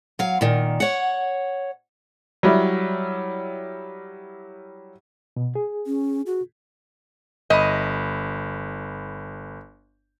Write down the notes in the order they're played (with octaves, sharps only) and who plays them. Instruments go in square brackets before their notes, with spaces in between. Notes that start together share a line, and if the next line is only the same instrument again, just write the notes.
[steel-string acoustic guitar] F#3 F5
A#2 D#3
C#5 F#5
[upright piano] F#3 G3 E4
[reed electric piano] B2
G#4
[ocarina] C#4
F#4
[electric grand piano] G1 B5 [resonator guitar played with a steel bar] D#5